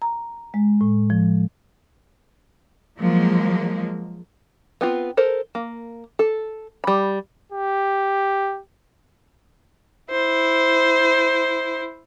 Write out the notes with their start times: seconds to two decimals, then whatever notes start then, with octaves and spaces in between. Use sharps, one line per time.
0.02 A#5
0.54 G#3
0.81 A2
1.10 F3
3.00 F3 F#3 G#3 A#3
4.81 B3 C4 F4
5.17 A4 A#4 C5
5.55 A#3
6.19 A4
6.84 G3 B5
7.52 G4
10.11 E4 C5